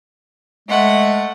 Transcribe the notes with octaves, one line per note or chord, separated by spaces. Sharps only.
G#3 A3 F#5